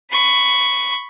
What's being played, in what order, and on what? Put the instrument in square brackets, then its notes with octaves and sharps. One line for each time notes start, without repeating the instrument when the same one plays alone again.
[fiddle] B5 C#6